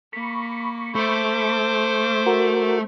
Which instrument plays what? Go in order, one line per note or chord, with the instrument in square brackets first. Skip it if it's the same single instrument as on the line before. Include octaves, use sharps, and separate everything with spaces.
[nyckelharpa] A#3 [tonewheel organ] B5 C#6
[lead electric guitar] A3 [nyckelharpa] C5 D6
[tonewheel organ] F#4 A#4